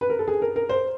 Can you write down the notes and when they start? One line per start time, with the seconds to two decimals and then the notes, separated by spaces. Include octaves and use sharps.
0.01 B4
0.10 A#4
0.19 A4
0.28 G#4
0.42 A#4
0.56 A#4
0.69 C5